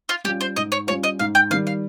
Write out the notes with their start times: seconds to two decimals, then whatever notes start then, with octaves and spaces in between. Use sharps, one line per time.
0.09 F4
0.24 G3 C#4 F4 G4
0.41 C5
0.56 G#2 D#5
0.72 C#5
0.87 G3 C#4 F4 C#5
1.03 D#5
1.19 G#2 F5
1.35 G5
1.50 D#3 F5
1.53 G3
1.67 F5